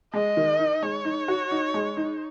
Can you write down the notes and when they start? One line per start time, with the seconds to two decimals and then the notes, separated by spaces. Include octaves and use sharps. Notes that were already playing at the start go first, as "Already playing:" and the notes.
0.14 G#3 D#5
0.37 D#3
0.59 D#4
0.83 G#3 C#5
1.05 D#4
1.28 F#4
1.51 D#4
1.74 G#3
1.97 D#4